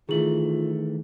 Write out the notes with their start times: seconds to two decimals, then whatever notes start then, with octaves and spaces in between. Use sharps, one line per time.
0.09 D#3 E3 A3 F4 G#4 F#7